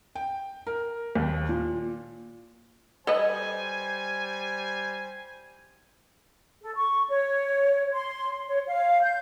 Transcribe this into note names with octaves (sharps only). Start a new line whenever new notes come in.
G5
A#4
D#2
A#2
G3 A4 B4 C5 D#5 G#5
A4
C#6
C#5
C6
C#5
F5
G6